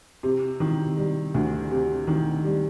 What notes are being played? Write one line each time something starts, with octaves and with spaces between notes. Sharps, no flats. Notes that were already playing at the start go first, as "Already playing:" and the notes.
C3
D#3
G3
D2
C3
D#3
G3